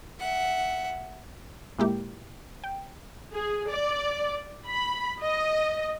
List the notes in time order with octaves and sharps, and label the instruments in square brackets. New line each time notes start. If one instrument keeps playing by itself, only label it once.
[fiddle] E5 F#5
[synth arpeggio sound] A#2 G#3 A#3 E4 G4
G5
[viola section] G#4
D5
B5
D#5